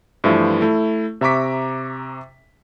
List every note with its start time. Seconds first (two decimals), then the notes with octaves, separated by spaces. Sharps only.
0.24 G2 E3 F3 A3 E4 F4
0.61 A3 E4
1.21 C3 E5 A#5 C#6 D6 B6